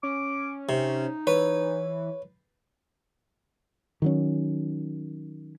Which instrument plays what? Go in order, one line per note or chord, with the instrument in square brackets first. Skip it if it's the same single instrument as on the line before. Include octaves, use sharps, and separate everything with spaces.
[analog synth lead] C#4 [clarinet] D6
[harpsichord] C3 [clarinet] D#4
[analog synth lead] E3 [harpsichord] B4 [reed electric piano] C#5
[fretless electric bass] D#3 F#3 C#4